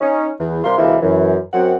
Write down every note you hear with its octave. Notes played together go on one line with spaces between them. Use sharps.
C#4 D#4
E2
C3 G3 F4 A#4 C6
D2 C3 E3 G#3 A#3 E4
F#2 E3
F#2 C4 F#5